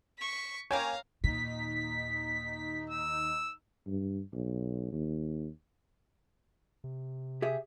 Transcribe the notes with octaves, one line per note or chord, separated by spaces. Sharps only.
C#6 B6
A#3 C#4 C#5 F5 G5 G#5 A#5
D#2 A#2 D#4 B6
E6
G2
B1
D#2
C3
G4 G#4 E5